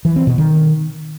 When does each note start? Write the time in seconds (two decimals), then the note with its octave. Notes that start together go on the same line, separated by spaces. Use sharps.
0.05 E3
0.16 C4
0.27 B2
0.38 D#3